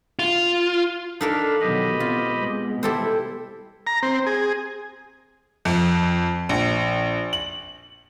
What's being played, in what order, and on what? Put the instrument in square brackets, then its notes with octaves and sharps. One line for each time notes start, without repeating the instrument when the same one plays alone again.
[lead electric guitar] F4
[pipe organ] D4 F5 B5 [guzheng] D#4 A4 A#4
[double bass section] B2 D#3 F#3 [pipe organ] G4 D#5 B5
[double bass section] B3 C4 [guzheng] F4
[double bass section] B2 G#3
[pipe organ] E4 [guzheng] G4 A4 C5
[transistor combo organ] A#5
C4
G#4
[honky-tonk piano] F2
A#1
F#7